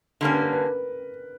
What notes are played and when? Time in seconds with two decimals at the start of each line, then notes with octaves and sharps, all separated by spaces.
0.21 D3 G3 A#3 C#4
0.31 B4
0.42 A#4
0.53 B4